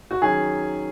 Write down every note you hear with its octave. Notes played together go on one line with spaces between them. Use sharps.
F#4
D#3 F#3 C#4 G#4